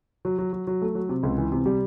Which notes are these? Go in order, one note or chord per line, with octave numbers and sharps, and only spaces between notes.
F#3
F#3
F#3
F#3
A3
F#3
C3
C#2
E3
C3
G3